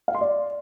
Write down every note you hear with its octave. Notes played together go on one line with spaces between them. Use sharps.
F5
C6
D5